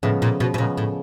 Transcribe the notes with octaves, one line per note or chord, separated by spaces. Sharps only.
A2 C#3 F3 G#3 B3
A#2
B2
B2
A#2 C#3 F3 G#3 B3
A2